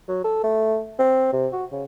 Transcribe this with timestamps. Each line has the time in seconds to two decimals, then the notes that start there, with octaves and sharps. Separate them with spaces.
0.08 F#3
0.24 A4
0.44 A3
0.99 C4
1.33 C3
1.53 F#4
1.72 C#3